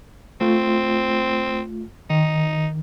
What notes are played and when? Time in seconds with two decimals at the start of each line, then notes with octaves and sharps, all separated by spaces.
0.41 A3 C4 F4
2.10 D#3 D#4